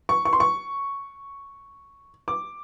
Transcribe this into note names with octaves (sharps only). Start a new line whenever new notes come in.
C#6
C#6
C6
C#6
D6